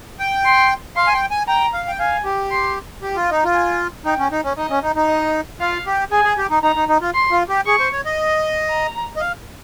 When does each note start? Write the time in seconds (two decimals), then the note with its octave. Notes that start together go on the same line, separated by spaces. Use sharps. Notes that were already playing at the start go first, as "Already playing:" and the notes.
0.20 G5
0.45 C6
0.96 F5 C6
1.07 G#5
1.14 G5
1.31 G#5
1.48 G5 A#5
1.73 F5
1.88 G5
1.99 F5 G#5
2.25 G4
2.51 C6
3.02 G4
3.16 F4
3.30 D#4
3.44 F4
3.54 G#5
4.05 D#4 G5
4.19 C#4
4.32 D#4
4.44 C#4
4.57 D#4 D#5
4.70 C#4
4.83 D#4
4.96 D#4
5.08 D#5
5.60 F4 F5
5.86 G4
6.11 G#4 G#5
6.25 G#4
6.38 G4
6.50 D#4
6.63 D#4 A#5
6.76 D#4
6.89 D#4
7.01 F4
7.14 C6
7.31 F4
7.49 G4
7.66 G#4 C#6
7.79 C5
7.92 C#5
8.05 D#5
8.69 A#5
9.16 D#5
9.20 F5